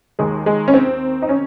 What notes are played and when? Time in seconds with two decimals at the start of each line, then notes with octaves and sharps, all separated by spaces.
0.19 D#2 D#3 G#3
0.46 G#3
0.68 C#4
0.74 C4
1.22 D#4
1.29 C#4